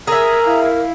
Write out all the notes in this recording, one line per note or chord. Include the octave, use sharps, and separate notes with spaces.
G#4 A#4 E5 A#5
E4 F5